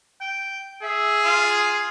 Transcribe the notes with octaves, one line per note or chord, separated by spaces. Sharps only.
G5
G#4 E5
F4